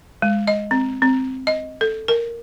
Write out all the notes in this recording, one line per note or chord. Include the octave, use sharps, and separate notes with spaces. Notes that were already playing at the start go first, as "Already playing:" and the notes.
G#3
D#5
C4
C4
D#5
A4
A#4